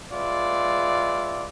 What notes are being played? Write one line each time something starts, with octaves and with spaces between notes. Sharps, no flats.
G#3 F4 B4 D5 E5